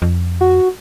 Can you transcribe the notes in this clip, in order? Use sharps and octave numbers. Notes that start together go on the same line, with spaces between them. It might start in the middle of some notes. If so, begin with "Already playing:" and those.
F2
F#4